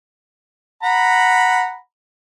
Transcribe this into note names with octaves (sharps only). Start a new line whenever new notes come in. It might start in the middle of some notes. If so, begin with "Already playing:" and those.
F#5 A#5 B5